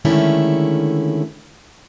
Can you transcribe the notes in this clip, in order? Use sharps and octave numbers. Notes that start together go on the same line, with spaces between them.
D3 D#3 G#3 A3 C#4 E4